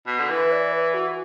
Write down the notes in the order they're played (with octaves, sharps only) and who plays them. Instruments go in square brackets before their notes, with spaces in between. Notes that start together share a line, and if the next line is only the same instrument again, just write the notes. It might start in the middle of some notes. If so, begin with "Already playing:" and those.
[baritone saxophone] B2
D3
[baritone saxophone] E3 [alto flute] B4
[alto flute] D5
B4
F#4